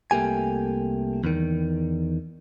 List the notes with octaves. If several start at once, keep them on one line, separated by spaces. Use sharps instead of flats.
C2 A3 A#3 G4 G#5
E2 D#3